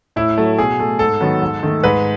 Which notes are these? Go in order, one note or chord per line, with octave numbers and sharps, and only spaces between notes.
A2 E4
F#3 A3
B2 G#4
A3
G#2 A4
D#3 F#3 B3
G#2
D#3 A3
G#2 B4